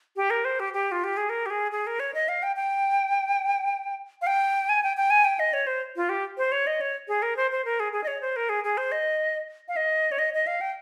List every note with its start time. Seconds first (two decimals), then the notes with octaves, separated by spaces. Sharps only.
0.16 G4
0.30 A#4
0.45 C5
0.60 G4
0.73 G4
0.92 F4
1.04 G4
1.17 G#4
1.30 A#4
1.46 G4
1.50 G#4
1.72 G#4
1.87 A#4
2.00 C#5
2.14 D#5
2.28 F5
2.43 G5
2.56 G5
4.22 F5
4.27 G5
4.69 G#5
4.83 G5
4.97 G5
5.10 G#5
5.24 G5
5.40 D#5
5.53 C#5
5.67 C5
5.96 F4
6.09 G4
6.38 C5
6.52 C#5
6.67 D#5
6.81 C#5
7.08 G#4
7.22 A#4
7.37 C5
7.51 C5
7.65 A#4
7.80 G#4
7.93 G#4
8.04 D#5
8.07 C#5
8.21 C5
8.36 A#4
8.49 G#4
8.64 G#4
8.77 C5
8.92 D#5
9.68 F5
9.76 D#5
10.12 C#5
10.19 D#5
10.34 D#5
10.47 F5
10.61 G5